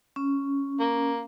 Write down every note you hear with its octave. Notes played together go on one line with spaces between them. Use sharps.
C#4
A#3